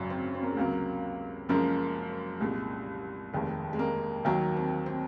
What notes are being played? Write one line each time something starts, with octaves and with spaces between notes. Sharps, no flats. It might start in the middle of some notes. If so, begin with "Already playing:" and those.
Already playing: G#1 F#2 C#3 F#3 C#4
C4
C4
A#3
G#3
C#2 C3 F#3 A#3
F#1 F#2 F3 G#3 A#3
C2 A#2 G#3
F1 D#2 D#3 G#3
G#3
A#3
D#2 D#3 F#3 A#3
C4
C4